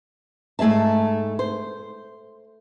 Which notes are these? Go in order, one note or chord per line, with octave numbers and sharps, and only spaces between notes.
G#2 A3 G#4 E5 A5
C5